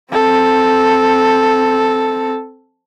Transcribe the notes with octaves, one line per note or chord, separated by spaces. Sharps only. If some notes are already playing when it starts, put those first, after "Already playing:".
C4 A4